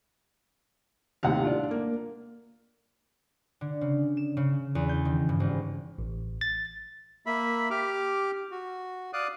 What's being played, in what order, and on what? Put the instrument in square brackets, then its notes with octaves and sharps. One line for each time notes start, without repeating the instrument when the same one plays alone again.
[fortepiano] D#2 A2 C3 [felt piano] F5 F#5
[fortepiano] D4 F4 D5
[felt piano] A#3
[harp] D3
C#3
E7
C#3
E2
G6
D#3
G2
G#1
[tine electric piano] A1
A6
[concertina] A#3 E5 B5
G4 D6 F6
F#4
D5 F5 D#6 F#6